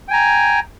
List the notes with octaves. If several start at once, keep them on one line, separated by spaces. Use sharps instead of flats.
G5 G#5 A#5